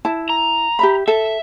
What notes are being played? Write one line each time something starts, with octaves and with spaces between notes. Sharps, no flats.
E4 A5
A#5
G4 E5 B5
A4 E5